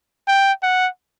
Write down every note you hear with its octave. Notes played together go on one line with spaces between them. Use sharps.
G5
F#5